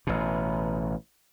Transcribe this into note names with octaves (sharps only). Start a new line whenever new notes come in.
A1 B2